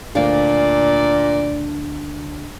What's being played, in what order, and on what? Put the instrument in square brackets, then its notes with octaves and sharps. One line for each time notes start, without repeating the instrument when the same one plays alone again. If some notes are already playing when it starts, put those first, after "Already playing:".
[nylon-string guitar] D2 D4 F5 [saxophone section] A#2 D5